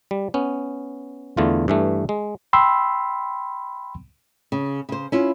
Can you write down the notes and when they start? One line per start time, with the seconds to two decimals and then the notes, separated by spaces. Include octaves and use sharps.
0.11 G3
0.34 B3 C#4
1.37 E2 D3 A3 F4
1.68 G2 E3 A3
2.09 G#3
2.53 G5 B5 C6 E6
4.52 C#3
4.89 C#3 C5
5.12 C#4 E4 F4